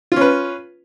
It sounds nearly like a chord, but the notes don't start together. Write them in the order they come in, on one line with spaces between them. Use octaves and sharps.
F4 C#4 B4